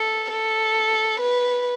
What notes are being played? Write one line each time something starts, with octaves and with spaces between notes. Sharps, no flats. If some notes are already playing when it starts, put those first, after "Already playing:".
Already playing: A4
A4
B4